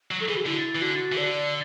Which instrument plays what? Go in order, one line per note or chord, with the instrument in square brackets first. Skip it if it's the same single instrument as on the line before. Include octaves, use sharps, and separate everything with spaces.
[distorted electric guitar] F#3
[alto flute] A4
[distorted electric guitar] E3 [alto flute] G#4
[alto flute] F#4
[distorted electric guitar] D3 [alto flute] E4
[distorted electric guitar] E3
[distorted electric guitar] D3 [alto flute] F#4
[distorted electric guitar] E3
[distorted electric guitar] D3 [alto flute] D5